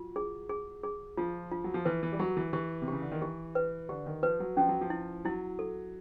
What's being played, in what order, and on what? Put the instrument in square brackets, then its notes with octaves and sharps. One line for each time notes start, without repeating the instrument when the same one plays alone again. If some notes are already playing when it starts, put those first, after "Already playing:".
Already playing: [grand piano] F#3 [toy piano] F4
[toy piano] G#4
G#4
G#4
[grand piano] F3 [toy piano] F4
[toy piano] F4
[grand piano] F#3
F3
[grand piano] E3 [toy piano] B4
[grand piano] E3
G3
[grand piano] F#3 [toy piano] G4
[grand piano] E3
[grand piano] E3 [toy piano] G4
[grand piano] C3
[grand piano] C#3 [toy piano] G4
[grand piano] D3
D#3
[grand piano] E3 [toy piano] G4
[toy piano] B4
[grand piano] D3 [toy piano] G4
[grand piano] D#3
[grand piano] F3 [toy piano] B4
[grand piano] F#3
[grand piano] F3 [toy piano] C#4
[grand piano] F#3
F3
[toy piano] E4
[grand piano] F#3 [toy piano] E4
[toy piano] A4